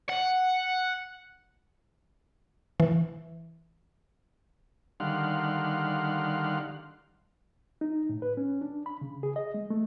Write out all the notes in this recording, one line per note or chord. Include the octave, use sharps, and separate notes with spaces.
F#5
E3
D3 D#3 G3 F5 F#5 C6
D#4
A2
B4
C#4
D4
B5
C#3
G#4
D#5
G#3
A3